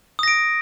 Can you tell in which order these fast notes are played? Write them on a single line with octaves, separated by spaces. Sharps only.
D#6 A#6 D7